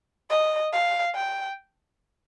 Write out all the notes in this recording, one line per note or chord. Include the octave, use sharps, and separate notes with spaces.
D#5
F5
G5